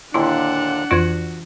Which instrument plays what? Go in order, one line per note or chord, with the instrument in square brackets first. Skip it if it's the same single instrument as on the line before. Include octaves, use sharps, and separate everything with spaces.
[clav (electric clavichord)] D#2 A#2 D3 [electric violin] D4 F#5 [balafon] E4 [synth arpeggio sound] C6
[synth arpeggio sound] F2 D5 G#6 [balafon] E3 F4 [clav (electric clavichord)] F#4